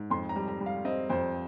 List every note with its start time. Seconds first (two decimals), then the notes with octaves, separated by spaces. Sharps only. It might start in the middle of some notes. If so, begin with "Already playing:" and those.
Already playing: G#2
0.10 F2 C6
0.29 A#5
0.36 G3
0.48 A#5
0.61 G3
0.66 F5
0.85 C4 D#5
1.10 F2 C5